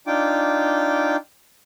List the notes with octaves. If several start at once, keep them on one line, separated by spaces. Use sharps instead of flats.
D4 D#4 F4 G5 D6